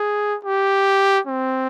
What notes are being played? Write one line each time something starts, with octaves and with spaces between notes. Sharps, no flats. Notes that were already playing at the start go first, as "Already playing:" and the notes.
Already playing: G#4
G4
C4